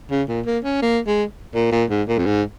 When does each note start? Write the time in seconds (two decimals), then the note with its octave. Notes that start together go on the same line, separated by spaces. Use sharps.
0.11 C#3
0.28 A#2
0.46 A#3
0.64 C#4
0.82 A#3
1.07 G#3
1.55 A#2
1.72 A#2
1.90 G#2
2.08 A#2
2.18 F2
2.26 G#2